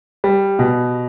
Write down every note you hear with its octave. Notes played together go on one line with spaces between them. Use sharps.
G3
B2